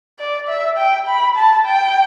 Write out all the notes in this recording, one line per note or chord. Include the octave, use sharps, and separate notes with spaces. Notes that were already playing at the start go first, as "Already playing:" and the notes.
D5
E5
G5
B5
A5
G5